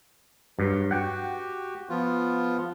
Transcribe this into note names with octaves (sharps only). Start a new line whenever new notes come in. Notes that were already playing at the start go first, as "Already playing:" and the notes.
G2 F#3
F#4 G4 F#5 G5
F3 B3 F4